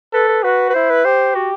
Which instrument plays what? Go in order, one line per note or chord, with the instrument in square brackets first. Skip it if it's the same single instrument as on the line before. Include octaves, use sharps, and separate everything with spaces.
[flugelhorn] A4 [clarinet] B4
[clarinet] B4
[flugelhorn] F#4 [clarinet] B4
[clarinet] B4
[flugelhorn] E4 [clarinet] C5
[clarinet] B4
[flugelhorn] G4 [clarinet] C5
[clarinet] F#4